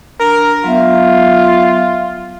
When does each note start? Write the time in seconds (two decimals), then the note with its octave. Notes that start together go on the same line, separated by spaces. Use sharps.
0.20 D4 A#4
0.64 F#3 B3 F4 E5